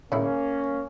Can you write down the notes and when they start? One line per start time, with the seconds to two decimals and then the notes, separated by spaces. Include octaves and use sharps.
0.12 C#3 A#3 C#4 E4